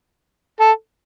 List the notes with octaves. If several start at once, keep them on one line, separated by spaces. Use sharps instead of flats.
A4